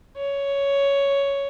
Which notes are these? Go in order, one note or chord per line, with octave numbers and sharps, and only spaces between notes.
C#5